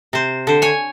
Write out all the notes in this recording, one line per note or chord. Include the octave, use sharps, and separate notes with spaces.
C3 C5
D3 C5
C#5 G#5